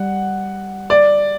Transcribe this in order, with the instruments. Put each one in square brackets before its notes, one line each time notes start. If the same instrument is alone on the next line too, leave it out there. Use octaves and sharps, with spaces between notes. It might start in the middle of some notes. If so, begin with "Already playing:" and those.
Already playing: [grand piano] G3 [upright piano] F#5
[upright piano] D5